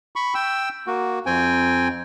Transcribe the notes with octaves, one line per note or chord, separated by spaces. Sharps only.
B5 C#6
G5 E6
A#3 F#4
F2 C4 G5 G#5